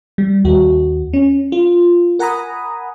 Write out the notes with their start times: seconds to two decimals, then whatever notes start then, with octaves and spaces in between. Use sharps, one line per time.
0.18 G3
0.44 D#2 F#4
1.13 C#4
1.52 F4
2.19 A#4 F#5 G#5 A#5 B5 D#6